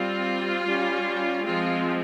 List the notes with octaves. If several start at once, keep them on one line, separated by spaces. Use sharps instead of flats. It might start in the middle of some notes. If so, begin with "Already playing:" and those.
Already playing: G3 C4 F4
G3 C#4
F3 G#3 C4 F4